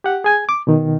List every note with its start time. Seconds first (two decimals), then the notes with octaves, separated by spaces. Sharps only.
0.04 G4 F#5
0.24 G#4 G#5 G#6
0.49 D6
0.67 B2 D#3